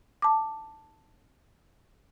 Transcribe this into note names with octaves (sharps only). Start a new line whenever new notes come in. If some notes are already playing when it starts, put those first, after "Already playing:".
A5 D6